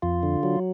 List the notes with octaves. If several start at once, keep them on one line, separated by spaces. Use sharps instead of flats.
F2 F4
D3
F#3